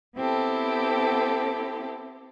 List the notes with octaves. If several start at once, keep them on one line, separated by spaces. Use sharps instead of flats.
B3 C4 E4 G4 A4